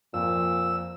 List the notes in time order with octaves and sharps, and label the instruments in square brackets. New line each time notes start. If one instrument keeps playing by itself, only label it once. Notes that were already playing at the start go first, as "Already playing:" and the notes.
[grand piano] F2 [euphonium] A#2 [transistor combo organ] E6